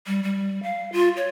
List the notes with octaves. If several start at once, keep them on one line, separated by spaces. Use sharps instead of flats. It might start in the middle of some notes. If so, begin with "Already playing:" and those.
G3
G3
F5
F4
C#5